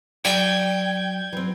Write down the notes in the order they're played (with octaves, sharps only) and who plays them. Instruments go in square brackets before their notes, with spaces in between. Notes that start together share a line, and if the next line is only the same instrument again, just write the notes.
[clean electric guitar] F#3 [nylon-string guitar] D5 [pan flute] G5 [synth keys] G6 G#6
[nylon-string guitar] E3 C4 [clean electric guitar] F#3